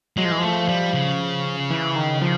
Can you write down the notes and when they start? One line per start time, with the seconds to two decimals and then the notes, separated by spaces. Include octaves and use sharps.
0.17 F#3 G#3
0.25 F3
0.32 E3
0.39 F3 A3
0.68 G3
0.94 C#3
1.70 E3
1.96 D#3
2.22 F3